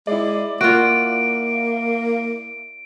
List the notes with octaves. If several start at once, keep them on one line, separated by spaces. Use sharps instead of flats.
G#3 E4 D5
A#3 F4 F#4 D7